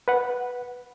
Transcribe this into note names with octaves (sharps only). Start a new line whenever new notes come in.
B4 F#5